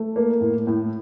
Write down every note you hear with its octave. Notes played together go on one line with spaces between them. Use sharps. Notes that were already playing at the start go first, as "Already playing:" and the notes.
Already playing: A3
A#3
A2
A2